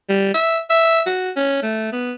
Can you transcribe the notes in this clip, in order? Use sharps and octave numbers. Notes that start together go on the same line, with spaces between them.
G3
E5
E5
F#4
C#4
A3
B3